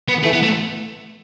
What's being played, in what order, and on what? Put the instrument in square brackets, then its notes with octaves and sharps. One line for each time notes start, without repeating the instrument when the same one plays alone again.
[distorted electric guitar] B3
[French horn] E3 [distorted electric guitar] A3
[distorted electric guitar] B3
A3